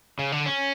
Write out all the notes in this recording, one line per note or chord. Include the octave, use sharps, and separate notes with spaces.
C#3
D3
C#4